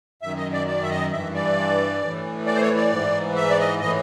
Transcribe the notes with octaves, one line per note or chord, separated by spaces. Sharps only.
F#2 D#3 E5
D#5
D5
D5
E5
D#5
G2 E3 E5
D5
A2 E3
D5
C5
C#5
D5
G#2 E3
E5
D5
D#5
A2 E3 D#5